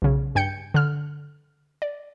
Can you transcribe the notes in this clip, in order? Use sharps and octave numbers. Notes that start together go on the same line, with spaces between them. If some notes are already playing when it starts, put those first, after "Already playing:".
B1 C#3
G2 G5 G6 C#7
D3 F6
D5